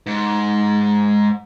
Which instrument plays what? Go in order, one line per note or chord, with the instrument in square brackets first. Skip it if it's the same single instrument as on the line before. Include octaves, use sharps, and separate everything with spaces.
[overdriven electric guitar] G#2